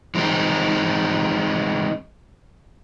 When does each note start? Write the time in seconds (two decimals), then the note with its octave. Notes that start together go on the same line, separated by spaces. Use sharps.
0.15 E3 G#3 C4 D#4